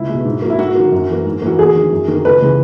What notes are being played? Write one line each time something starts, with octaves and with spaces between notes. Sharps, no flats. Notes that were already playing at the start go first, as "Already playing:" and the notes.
Already playing: C#2 E4
B2 G#3
G#2
F#3 A#3
E4
G#2 F#4
D#3 F#3 A#3
F#2
E3 A#3
G#2
E3 A#3 F#4
E2 G#4
D#3 F#3
F#2
D#3 F#3 A#3
C#2 B4
C#3 E3 G#3